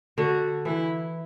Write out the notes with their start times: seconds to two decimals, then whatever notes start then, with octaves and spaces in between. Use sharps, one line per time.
0.18 D3 F#4
0.65 E3 E4